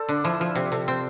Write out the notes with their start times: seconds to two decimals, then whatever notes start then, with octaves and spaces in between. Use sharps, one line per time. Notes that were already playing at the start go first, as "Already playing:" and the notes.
Already playing: A4 C5 D5
0.09 D3 D4
0.24 F3 E4
0.40 F3 F4
0.55 C3 G4
0.72 C3 A4
0.88 C4